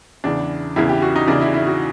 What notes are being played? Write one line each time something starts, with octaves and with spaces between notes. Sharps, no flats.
E2 C#3 E3 D4
E2 C#3 E3 E4
G4
F#4
D#4
E2 C#3 E3 D4
E4
E4
F#4